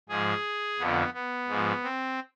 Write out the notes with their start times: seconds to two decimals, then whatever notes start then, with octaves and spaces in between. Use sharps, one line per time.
0.09 G#2 F3 G#4
0.79 F2 D3 F3 B3
1.14 B3
1.48 G#2 F3
1.83 C4